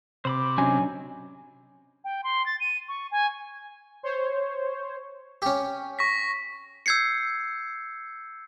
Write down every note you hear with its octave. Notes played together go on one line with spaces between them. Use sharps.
C3 C5 B5 D6
F#3 C#4 D4 D#5 G#5
G5
C6
A6
D#7
C#6
G#5
C5 C#5
C#4 G4
C#6 A#6 B6
E6 G6 G#6 C7 C#7